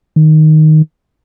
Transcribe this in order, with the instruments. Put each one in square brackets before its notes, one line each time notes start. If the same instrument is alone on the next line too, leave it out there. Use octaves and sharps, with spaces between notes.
[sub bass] D#3